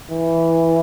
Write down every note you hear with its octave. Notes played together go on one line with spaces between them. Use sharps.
E3